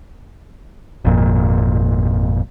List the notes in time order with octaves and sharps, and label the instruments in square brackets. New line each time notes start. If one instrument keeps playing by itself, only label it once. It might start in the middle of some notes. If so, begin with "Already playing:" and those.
[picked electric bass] G#1 F2 A#2